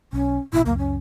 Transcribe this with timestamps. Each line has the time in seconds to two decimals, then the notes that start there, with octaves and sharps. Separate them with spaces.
0.13 B1 C#4
0.53 A1 B2 E4
0.66 C#2 F#2 A#3
0.78 C#4